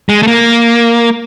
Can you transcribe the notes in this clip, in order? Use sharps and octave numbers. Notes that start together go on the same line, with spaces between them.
G#3
A3
A#3